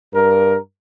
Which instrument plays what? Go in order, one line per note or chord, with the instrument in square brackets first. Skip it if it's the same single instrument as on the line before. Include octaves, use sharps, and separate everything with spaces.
[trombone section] G2 A#4